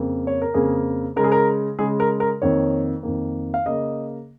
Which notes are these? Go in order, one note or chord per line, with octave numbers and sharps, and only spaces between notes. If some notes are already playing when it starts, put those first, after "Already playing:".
Already playing: F2 C#3 A#3
C#5
A#4
F2 C#3 A#3 G#4
C#3 G#3 A#4
G#4
A#4
C#3 G#3 G#4
A#4
A#4
F2 D#3 A#3 C#5
F2 D#3 A#3
F5
C#3 A#3 D#5